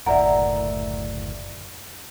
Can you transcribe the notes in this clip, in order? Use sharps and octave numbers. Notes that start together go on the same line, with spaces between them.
F#1 D2 A2 A#4 D5 E5 F#5